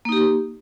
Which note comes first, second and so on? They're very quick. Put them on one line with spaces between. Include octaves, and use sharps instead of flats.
A#3 D#4 G4